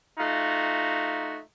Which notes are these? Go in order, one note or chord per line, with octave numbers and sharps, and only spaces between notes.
A3 D#4 F4 F#4